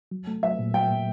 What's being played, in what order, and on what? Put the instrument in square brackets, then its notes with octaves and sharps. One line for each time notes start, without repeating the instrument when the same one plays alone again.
[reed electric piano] F#3
A3
[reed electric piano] F#3 [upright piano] E5
[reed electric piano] A#2
[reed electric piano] F#3 [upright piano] G5
[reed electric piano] A#2